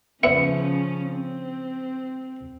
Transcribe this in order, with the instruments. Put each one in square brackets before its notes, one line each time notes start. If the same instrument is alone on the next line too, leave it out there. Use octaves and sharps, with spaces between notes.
[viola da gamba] C#3 F3 C#4 [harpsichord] B3 E5 [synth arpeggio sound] C#7
[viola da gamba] C4